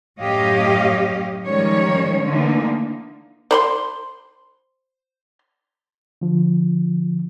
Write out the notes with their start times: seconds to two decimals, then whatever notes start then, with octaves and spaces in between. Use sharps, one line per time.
0.19 F#2 A2 G4 C#5 D#5 F5
1.46 D#3 F3 G3 G#3 C#4 C#5
2.25 D3 E3 A3 A#3 D#4
3.51 C5 B5 C6
6.21 D3 F3